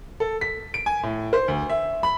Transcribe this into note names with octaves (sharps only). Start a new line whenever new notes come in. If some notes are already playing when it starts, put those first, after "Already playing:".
A4
B6
D7
G#5
A2
C5
D2
E5
B5